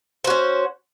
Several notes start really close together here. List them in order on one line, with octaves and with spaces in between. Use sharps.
C5 F#4 C#4